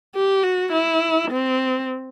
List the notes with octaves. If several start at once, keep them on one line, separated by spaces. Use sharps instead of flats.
G4
F#4
E4
C4